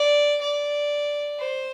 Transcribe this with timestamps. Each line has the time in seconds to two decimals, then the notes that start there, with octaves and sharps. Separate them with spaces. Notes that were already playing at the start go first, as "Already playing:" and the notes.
Already playing: D5
0.42 D5
1.39 C5